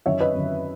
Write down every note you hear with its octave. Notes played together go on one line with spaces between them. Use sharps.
F#2 D#3 C#5 E5
B4 D#5
F#2 D#3